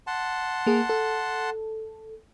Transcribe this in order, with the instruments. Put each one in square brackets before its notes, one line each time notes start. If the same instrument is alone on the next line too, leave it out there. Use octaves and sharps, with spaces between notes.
[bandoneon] F#5 A5 C6
[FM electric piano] A#3 G#4
A4